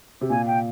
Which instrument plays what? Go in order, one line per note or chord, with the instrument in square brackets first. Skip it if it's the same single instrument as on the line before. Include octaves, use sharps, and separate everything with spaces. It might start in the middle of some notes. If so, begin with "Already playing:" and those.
[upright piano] C3
[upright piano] A#2 [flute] G#5
[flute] G5